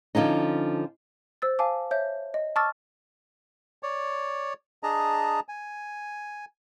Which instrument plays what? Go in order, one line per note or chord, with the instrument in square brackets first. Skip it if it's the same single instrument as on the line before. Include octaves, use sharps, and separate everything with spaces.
[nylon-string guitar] D3 F3 C#4 D#4
[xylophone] C5 E6 A6
F5 G#5 A5 D6
C#5 E5 G6
D#5
A5 C#6 D6 E6 F6 A6
[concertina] C#5 D5
D4 G#4 D#5 A5 A#5
G#5